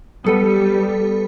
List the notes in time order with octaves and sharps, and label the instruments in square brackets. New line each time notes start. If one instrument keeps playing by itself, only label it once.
[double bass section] G3 [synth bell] B3 A4 B4